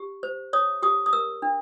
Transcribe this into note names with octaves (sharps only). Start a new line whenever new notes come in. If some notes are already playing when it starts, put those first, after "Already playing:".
Already playing: G4
C5
C#5 D#6
G4 D#6
D#6
A#4 E6
D4